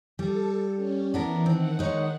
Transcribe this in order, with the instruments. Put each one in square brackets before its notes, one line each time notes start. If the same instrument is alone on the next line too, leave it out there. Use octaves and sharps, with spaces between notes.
[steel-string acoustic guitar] G3 [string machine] A4
[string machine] C#4
[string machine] E3 [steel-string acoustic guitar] B3 D4 A#4
[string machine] D#3 F#5 [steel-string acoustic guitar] C4
[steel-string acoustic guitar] G#3 D#4 C#5